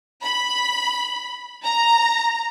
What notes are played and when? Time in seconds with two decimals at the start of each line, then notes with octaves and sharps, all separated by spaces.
0.23 B5
1.65 A#5